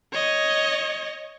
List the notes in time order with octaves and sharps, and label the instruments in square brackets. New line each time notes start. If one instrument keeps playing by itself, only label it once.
[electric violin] C#5 D#5